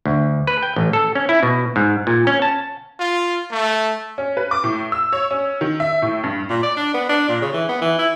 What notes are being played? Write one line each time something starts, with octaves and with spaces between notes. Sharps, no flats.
D2
B4
G5
A1
A4
C#4
E4
B2
G#2
A#2
C#4
A5
F4
A3
C#4
B4
D6
A2
E6
C#5
C#4
D#3
E5
A2
G2
A#2
D5
D4
B3
D4
A#2
C#3
E3
B3
E3
E4